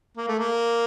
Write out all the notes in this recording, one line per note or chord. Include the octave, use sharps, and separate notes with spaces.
A#3
A3
A#3